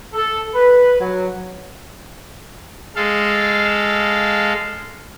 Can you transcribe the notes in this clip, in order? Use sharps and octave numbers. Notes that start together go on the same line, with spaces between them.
A4
B4
F#3
G#3 A4 F5